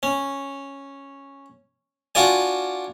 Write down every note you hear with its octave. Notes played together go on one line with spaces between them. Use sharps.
C#4
D4 F4 F#4 D5 G#5